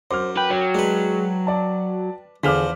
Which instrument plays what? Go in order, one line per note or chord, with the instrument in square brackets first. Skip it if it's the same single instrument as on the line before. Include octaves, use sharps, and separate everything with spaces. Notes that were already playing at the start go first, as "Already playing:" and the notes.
[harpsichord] F#2 [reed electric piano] C5 [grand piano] D6 F6
[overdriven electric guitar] B4 [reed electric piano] G5
[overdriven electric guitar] F#3 [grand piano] C#5
[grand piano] G#3 [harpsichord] D4 B4
[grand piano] D5 A5
[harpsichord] E2 F3 [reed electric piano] D3 G#4 [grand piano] D6 F6 B6